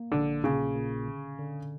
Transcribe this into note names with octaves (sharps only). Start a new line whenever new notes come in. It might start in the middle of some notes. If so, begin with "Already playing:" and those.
Already playing: A#3
A#1 D3
A#2 C#3
A#2
D3
D3